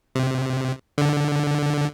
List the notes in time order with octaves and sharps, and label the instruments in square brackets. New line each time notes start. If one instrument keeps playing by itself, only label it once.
[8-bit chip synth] C3
D3